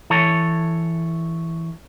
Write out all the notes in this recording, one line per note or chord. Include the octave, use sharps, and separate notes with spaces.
E3 A4 C#5